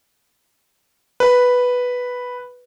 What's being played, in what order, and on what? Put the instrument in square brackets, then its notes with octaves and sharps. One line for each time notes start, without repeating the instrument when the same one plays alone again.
[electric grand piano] B4